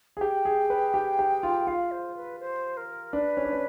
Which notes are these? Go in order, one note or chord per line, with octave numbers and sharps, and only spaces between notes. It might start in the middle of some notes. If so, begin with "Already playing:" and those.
G#4
G4 G5
G#4
B4
G4
G4
F4
F4 F5
C5
B4
C5
A#4
D4 B4
C#4
D4
C#4